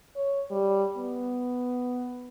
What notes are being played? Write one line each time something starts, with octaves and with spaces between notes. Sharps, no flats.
C#5
G3
B3